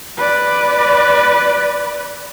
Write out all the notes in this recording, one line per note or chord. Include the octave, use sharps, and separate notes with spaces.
B4 D5